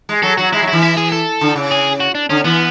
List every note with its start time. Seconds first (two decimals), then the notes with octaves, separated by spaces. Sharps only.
0.09 G#3
0.23 F#3 A4
0.38 F#3 F#4
0.53 G#3 E4
0.62 F#3
0.68 E3 E4
0.83 E4
0.97 G#4
1.12 A4
1.41 D3
1.55 C#3
1.71 G#4
2.00 F#4
2.15 D4
2.30 D3 C#4
2.44 E3 B3